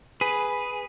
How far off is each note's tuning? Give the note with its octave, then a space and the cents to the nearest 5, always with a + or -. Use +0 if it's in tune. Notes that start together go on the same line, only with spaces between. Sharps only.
G#4 +0 B4 +0